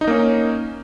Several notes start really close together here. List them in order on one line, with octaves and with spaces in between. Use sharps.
D#4 D#5 A#3 C#4